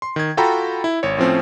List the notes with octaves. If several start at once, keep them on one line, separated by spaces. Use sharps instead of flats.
C6
D#3 G#6
F4 F#4 A4 G5 A#5 B5
E4
G#1 C#5
A2 F3 C4 C#4